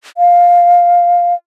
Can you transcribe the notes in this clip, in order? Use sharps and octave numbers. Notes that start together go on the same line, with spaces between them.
F5